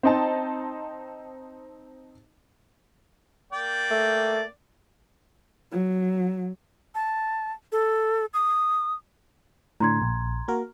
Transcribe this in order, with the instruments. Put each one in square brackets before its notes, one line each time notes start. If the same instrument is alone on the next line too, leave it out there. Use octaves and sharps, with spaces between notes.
[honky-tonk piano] C4 D#4 A5
[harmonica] A#3 D5 G5
[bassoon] A3
[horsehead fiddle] F#3
[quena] A5
A4
D#6
[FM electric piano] A2 D3 [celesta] A#5 C6 G#6
[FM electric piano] A#1
A#3 F#4 A#4